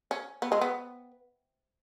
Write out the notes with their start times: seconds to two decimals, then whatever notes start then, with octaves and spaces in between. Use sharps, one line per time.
0.11 C#4
0.42 B3
0.52 G#3
0.61 B3